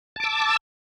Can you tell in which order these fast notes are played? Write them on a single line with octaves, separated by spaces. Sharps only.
A5 D6 E6